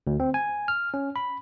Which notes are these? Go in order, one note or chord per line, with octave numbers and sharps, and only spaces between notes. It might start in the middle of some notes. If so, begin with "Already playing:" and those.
D2
C4
G#5
F6
C#4
B5